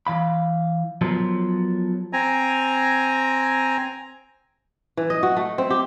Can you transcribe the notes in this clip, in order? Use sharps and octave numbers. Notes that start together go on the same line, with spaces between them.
E3 F5 B5
F3 F#3 B3 A4 A#4 C5
C4 G#5 A#5
E3
D#5
F#4
A3
C4
G4